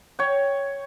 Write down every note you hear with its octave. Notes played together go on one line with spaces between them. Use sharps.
C#5 G5